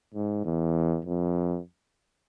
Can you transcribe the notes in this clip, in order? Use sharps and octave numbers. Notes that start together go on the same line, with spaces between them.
G#2
E2
F2